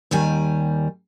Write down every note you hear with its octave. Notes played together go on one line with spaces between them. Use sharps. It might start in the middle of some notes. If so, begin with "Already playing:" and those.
D#2 D#3 G3 G#5